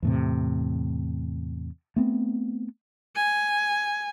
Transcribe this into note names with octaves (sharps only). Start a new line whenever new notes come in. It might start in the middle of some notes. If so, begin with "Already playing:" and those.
E2 A2 C3
A3 B3 C4
G#5